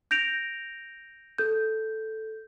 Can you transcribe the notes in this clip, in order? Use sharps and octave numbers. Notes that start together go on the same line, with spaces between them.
G6 A#6 D7 F7
A4 G6